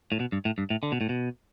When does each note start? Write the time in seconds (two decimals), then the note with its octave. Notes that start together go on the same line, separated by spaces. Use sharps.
0.12 A2
0.20 B2
0.32 G2
0.45 A2
0.58 G2
0.70 A2
0.83 D3
0.92 B2
1.01 A2
1.09 B2